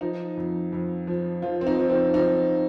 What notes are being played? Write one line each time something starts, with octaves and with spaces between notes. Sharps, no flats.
F3 D#4
F2
F2
F3
F3 F4
C4
D#4
F3
C4
F3 D#4